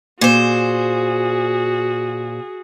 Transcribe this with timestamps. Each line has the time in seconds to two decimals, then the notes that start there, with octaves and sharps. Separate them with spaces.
0.21 A#2 F#4 G#4 C5